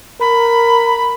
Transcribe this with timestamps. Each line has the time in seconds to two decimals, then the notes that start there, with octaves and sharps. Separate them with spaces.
0.21 A#4 B5